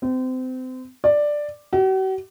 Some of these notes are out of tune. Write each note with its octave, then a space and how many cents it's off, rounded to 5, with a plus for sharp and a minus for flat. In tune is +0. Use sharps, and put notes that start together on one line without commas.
C4 -30
D5 +5
F#4 +45